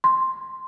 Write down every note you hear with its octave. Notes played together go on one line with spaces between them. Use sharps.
C6